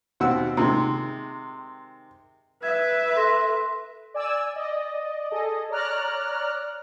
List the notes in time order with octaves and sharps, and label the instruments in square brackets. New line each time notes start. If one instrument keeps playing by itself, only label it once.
[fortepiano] D#2 B2 C4 F#5 E6
C3 D#3 G#3
[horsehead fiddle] B4 E5 [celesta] G#6
[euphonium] A4 [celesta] C6 A#6
[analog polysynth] D5 G#5 E6
D5 D#5
G#4 A4 D#5
C#5 D5 A#5 F6 F#6